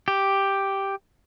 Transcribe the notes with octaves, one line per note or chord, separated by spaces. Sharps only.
G4